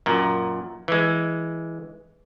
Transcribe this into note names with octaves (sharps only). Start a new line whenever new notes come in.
F#2 A#2
E3 G#3